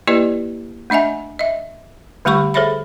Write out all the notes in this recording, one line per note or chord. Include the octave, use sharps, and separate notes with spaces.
A#3 E4 G4 B4 D5 D#5
A3 D4 D#5 E5 G#5
D#5 E5
D3 G3 A3 G4 B5 C#6
G#4 A4 C5 C#5 E5 B5